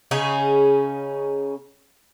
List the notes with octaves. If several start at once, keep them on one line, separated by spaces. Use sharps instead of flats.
C#3 C#4 D#4 G#4